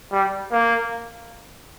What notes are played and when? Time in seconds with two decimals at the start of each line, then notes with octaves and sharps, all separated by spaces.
0.12 G3
0.52 A#3